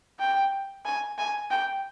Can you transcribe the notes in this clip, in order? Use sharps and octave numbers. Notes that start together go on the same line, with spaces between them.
G5
G#5
G#5
G5